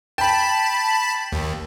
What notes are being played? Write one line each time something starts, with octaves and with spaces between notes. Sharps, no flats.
G5 A5 B5
D#2